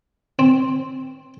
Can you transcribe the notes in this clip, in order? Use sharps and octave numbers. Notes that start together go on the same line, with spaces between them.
C4